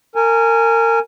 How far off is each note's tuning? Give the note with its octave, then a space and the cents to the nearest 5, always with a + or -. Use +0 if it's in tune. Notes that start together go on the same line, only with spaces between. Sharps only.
A#4 -25 G#5 +0